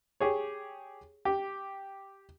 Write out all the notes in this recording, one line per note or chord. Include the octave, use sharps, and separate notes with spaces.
G4 G#4 C#5
G4